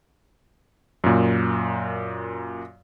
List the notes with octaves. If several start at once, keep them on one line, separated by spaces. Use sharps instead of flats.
F#2 A#2